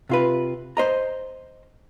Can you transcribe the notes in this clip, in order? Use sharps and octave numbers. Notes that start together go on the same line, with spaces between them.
C3 F4 B4
C5 D#5 A#5